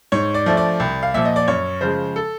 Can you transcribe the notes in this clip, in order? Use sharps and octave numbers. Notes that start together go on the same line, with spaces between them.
G#2 C#5
D5
F3 A3 D4
D5
C2
F5
A#2 F3 E5
D#5
D5
F#2 C#5
C#3 F3 G#3 C5
A4